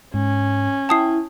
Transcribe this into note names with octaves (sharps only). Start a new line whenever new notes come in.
G#2 C#4
E4 G5 A5 D#6 C7